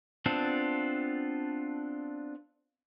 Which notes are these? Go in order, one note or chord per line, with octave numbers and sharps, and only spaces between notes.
B3 C4 D4 F4 A4